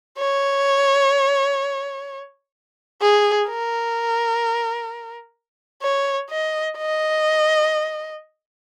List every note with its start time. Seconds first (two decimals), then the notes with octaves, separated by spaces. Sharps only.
0.19 C#5
3.02 G#4
3.49 A#4
5.83 C#5
6.30 D#5
6.77 D#5